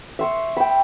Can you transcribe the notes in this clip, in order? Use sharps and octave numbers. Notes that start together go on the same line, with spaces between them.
E5 C6 C#6
G5 B5